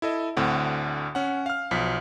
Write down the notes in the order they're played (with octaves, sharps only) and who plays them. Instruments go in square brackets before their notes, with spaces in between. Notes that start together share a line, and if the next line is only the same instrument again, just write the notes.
[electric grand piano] E4 A4 D#5
D2 A2 D3 C4 F#5
C#4 F#5
F5 F6
B1 F3 B6